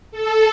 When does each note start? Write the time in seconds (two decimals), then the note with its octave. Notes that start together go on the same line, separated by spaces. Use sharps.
0.12 A4